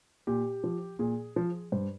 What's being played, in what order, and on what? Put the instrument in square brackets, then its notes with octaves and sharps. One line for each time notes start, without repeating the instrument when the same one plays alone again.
[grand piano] A#2 G4
F3
A#2 G#4
F3
G2 C5